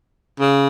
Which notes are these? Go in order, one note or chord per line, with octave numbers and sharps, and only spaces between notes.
C#3